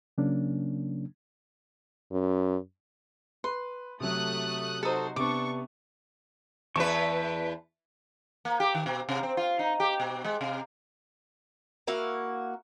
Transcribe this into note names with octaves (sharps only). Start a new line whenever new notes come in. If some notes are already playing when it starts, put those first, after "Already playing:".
C#3 F#3 A#3 C#4 D4
F#2
B4 C6
C3 F#3 A3 D#6 F#6
D#4 F#4 A4 C5 D#6
C3 B3 D4 C#6 D6
E2 B4 E5 A5 C#6
A#3
G4
D#3
B2
C3
C4
F4
D#4
G4
B2
G#3
C3
A#3 E4 F#4 F5